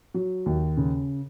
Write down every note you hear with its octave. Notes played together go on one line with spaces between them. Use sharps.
F#3
D#2
C#3